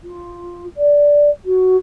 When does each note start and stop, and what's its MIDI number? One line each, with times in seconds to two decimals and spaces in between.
0.04 0.65 65
0.77 1.30 74
1.45 1.76 66